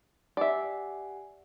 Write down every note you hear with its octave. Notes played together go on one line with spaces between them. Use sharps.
G4 D5 E5 F#5 G#5